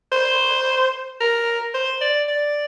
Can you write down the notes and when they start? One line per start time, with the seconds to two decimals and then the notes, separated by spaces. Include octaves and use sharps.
0.12 C5
1.21 A#4
1.74 C5
2.02 D5
2.28 D5